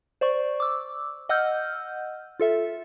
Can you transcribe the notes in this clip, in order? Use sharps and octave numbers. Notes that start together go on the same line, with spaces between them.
C5 D5 C#6
D6 E6
D#5 F#5 E6 F6 G6
F4 A4 E5